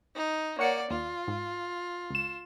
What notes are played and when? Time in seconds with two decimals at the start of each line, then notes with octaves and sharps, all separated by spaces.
0.15 D#4
0.59 A#3 C#5 D5 F#5 C#7
0.90 D#2 F4
1.28 G#2
2.10 C#2 E7